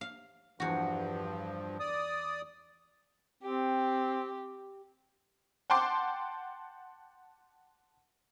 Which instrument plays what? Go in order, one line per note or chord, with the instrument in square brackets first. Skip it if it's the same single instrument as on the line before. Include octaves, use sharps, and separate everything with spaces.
[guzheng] F5
[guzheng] E2 F#4 [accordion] G2 F3
[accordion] D5 D#6
[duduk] C4 [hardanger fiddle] G4
[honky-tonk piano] F#5 G5 A5 C6 D6